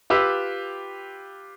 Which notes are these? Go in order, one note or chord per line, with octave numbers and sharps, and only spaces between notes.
F4 G4 B4 E6